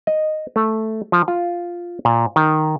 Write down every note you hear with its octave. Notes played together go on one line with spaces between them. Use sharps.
D#5
A3
F3
F4
A#2
D#3